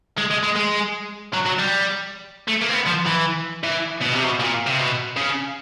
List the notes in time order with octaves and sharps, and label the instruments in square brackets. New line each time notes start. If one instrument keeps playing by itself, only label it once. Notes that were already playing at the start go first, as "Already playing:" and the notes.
[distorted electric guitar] G#3
G#3
G#3
G#3
F#3
F#3
G3
A3
A#3
C4
B3
F3
E3
E3
B2
C3
B2
A#2
C3
B2
C#3